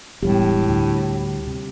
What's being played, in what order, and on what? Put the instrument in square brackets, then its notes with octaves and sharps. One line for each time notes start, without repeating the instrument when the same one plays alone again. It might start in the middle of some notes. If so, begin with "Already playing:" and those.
[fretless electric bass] E1 [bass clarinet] A2 [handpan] G3 G4
[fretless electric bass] D2
[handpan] C3